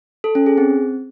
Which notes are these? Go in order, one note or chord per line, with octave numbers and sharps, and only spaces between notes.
A4
C#4
G#4
C4